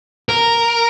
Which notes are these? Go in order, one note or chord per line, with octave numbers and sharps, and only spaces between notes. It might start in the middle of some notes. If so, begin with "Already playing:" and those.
A#4